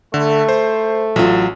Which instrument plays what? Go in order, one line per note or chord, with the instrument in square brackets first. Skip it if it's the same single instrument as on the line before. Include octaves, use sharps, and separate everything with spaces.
[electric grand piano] D3 [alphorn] A3
[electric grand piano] C5
[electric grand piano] A1 [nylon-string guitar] F#3 F4